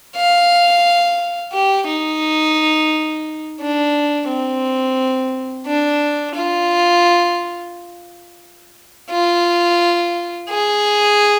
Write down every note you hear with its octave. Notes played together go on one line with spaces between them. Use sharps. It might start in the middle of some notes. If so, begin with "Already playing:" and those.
F5
G4
D#4
D4
C4
D4
F4
F4
G#4